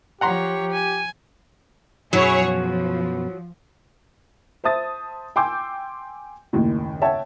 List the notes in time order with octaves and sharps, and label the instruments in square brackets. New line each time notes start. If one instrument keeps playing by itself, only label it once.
[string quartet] F3 C#5 [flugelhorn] G4 [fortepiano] F#5 A#5 C6
[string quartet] G#5
[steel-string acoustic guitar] F#2 B2 [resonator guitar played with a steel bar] F#3 [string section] E4 G#4 C#5
[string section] F3
[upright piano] C5 E5 A5 D#6 A6
G5 G#5 C6 D6 E6 G6
F#1 D#2 A2
C#5 E5 F#5 G5 A5